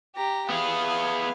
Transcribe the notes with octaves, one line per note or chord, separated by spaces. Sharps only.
G4 A#5
B3 G#4 F5